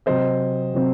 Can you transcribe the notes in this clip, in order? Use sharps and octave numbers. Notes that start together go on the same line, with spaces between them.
C3 F#3 C4 C5 D#5
C3 F#3 C4